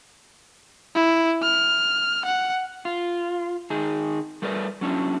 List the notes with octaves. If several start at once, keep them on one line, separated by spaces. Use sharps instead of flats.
E4
F6
F#5
F4
D#3 D#4 G#4
G3 A3 A#4 B4 D5
F#3 C#4 D4 E4